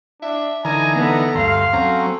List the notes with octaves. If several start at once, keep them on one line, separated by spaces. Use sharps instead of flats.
D4 E5
D3 E3 D#4 G#5 A#5
B3 A4
D2 G2 F5 C6
F#3 C4 C#4 A4 A#5